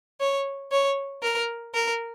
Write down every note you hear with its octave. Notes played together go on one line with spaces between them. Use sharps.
C#5
C#5
A#4
A#4